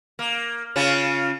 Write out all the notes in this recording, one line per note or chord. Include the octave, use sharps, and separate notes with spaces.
A#3
C#3 C#4 F4